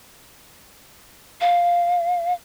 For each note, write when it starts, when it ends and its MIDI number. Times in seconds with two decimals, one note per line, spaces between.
1.41 2.33 77